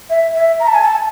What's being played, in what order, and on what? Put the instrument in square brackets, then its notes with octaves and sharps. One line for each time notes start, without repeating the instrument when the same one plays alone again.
[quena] E5
E5
A#5
A5
G#5
A5